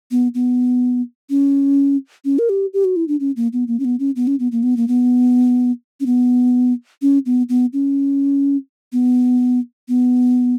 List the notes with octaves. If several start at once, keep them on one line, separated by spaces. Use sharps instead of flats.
B3
B3
C#4
C#4
A#4
G4
G4
F#4
E4
D4
C#4
A#3
B3
A#3
C#4
B3
C#4
B3
C#4
B3
A#3
B3
A#3
B3
C#4
B3
C#4
B3
B3
C#4
B3
B3